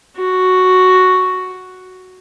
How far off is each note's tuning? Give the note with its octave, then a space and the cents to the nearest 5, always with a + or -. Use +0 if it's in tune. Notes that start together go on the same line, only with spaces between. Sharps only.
F#4 +0